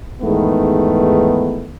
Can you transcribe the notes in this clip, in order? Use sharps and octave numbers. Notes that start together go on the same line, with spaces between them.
E2 G#2 D#3 A3 B3